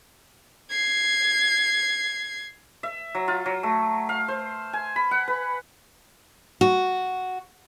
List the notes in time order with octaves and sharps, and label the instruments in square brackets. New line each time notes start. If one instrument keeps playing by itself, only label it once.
[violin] G#6 C7
[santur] E5
F#3
F4
F#3
A3
F5
C5
G#5
B5
F#5
B4
[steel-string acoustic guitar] F#4